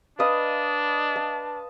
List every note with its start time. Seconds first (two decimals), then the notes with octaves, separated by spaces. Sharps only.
0.19 D4 B4 D#5 F5
1.16 A5